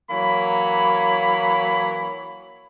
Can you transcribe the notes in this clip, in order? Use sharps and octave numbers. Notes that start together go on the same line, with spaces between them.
E3 F#3 A#3 C#5 B5